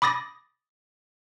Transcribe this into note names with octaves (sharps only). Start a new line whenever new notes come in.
B5 D6 D#6 A6 A#6